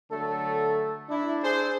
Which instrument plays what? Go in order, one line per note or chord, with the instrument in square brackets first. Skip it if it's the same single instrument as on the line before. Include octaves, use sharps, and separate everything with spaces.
[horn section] D3 F#3 A3 [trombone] A4
[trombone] D4 [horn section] E4
[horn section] G#4 C5